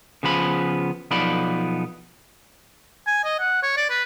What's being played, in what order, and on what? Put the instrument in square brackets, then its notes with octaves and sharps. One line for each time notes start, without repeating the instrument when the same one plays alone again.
[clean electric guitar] C#3 F3 B3 B5
B1 F3 B3 D#4 D5 B5
[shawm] G#5
D#5
F#5
C#5
D5
B4